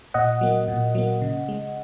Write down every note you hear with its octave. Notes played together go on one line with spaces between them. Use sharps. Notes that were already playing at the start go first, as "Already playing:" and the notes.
A#2 D#5 F#5
F#3 A#3
A#2
F#3 A#3
C#3
G#3